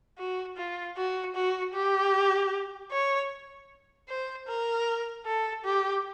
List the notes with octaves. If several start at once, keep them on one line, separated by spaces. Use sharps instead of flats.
F#4
F4
F#4
F#4
G4
C#5
C5
A#4
A4
G4